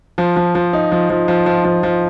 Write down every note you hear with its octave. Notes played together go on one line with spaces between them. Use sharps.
F3
F3
F3
D#4
F3
F3
F3
F3
F3
F3